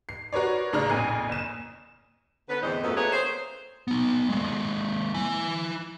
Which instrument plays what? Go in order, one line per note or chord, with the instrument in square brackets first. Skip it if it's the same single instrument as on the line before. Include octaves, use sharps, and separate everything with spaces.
[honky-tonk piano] C7
F#4 A#4 B4 C#5 D5
A1 C#3 D4 A#5 F6
A#1 F2 G#5 F6 C7
F#1 E7
[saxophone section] D3 B3 C#4 B4
E2 A2 D3 C4 C5 D#5
F#2 A#2 F#3 A3 B3 C#4
A3 A#3 D4 G#4 B4 C#5
C5
[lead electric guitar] B3 D#4
G#3 A#3
E4 G#5